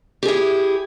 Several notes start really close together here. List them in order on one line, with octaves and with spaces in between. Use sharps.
G4 G#4 E4